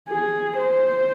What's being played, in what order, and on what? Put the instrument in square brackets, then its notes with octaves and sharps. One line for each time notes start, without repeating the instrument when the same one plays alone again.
[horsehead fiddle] G#4
C5